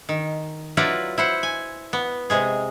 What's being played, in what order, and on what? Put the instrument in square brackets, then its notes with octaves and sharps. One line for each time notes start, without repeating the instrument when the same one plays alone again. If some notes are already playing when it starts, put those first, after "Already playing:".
[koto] D#3
F#3 E4 F4 B4 D5 A#5
E4 C5 F#5
G#5
B3
C3 G#3 G#4